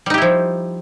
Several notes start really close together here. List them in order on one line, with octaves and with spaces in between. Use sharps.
G3 D#4 G4 E4 F3